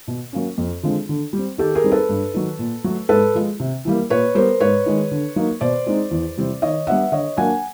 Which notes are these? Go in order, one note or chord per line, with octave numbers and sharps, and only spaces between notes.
B2
F#3 A#3 C#4
F2
D3 F3 G#3 C4
D3
G3
C4
D#3 G4 A4
G#4 A#4
G3 C4 D#4
A4 B4
G2
D#3 F#3
A#2
F#3 A3
G#2 A4 B4
F3 G#3
C3
E3 G3 A#3
A#2 B4 C#5
G3 B3 A#4 C5
G#2 B4 C#5
D#3 G#3
D3
F#3 A#3 D#4
B2 C5 D5
G#3 C4 D#4
E2
C3 E3 G3 C4
D#3 C#5 D#5
G3 B3 D4 E5 F#5
D3 C#5 D#5
F#3 A#3 D4 F#5 G#5